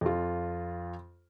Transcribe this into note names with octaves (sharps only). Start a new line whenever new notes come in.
F2 F4